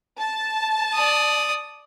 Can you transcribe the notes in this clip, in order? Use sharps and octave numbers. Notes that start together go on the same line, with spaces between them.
A5
D5 D#6